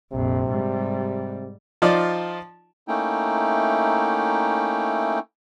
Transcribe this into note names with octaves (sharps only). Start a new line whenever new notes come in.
A#1 F2 C3
G#2 G3
F3 D#4 F4 D5
A3 A#3 C#4 D#4 E4 G5